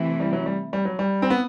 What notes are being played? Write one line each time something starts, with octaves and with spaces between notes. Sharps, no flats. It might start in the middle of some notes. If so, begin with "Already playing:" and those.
Already playing: C3 E3 A3 C4 E4
G3
F#3
G3
G3
F#3
G3
C4
B3